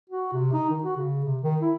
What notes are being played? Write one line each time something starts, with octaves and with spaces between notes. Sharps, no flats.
F#4
C3
D#4
D#3
F#4
C#3
C3
D#3
E4